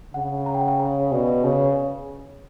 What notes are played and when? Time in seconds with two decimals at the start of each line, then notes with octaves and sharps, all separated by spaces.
0.14 C#3 F#5
0.46 A#5
0.54 G5
0.61 F#5
0.68 G5
0.79 C#5
1.12 B2 D5
1.44 C#3 C#5
1.52 B4
1.61 C#5